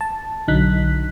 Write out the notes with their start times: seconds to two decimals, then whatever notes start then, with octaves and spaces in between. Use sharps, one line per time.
0.01 A5
0.48 B1 D3 F#3 D#4 F#6 B6